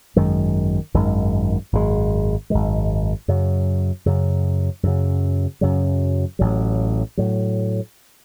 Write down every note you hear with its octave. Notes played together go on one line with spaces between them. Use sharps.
G#1 F#2 D#3 G#3
G#1 F#2 D#3 G#3
G#1 F#2 D#3 G#3
G#1 F#2 D#3 G#3
F#2 C#3 F#3
F#2 C#3 F#3
F#2 C#3 F#3
F#2 C#3 F#3
A1 A2 F#3
A2 F#3